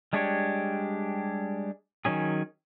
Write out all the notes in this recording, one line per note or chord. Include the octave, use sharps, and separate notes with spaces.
G3 G#3 D4 G4 C#5
D#3 F#3 C#4 G#4